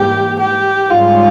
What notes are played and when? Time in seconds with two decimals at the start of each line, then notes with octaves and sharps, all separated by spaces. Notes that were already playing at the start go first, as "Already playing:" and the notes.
Already playing: G#2 E3 G3 A#3 G4
0.40 G4
0.89 G#2 G3 C#4 F4